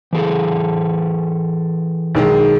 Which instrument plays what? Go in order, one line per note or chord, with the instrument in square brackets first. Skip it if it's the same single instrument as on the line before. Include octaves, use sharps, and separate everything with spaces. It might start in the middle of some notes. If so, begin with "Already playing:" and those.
[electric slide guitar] E3 G#4 A4
[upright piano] B1 D#3 G#3